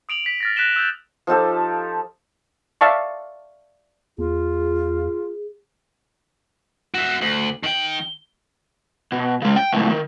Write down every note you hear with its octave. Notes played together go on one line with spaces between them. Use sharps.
D#6 D7 F7 F#7
B6
F6 A6 A#6
F#6 A#6 B6 D7 E7 G7
E6 G6 F#7
F3 D#4 G4 A4
D5 E5 F5 A5 C#6
E2 F4 G#4
F#4 E5
D2 F#7
D#3 G5 F#7
G7
B2
C#3 G#3
G5
C#2 A2
D#3